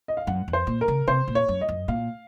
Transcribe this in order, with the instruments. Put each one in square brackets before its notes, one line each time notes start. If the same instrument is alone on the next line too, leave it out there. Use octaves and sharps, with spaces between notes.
[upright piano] D#5
F5
[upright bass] F#2 [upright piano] F#5
[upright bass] F2
[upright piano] C5
[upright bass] A#2
[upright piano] A#4
[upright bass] C#3
[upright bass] C3 [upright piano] C5
[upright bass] A#2
[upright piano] C#5
[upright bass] F#2
[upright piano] D#5
[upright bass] F#2
[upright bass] A#2 [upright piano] F5